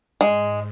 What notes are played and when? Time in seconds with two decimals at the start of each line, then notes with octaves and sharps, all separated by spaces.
0.21 G#2 G#3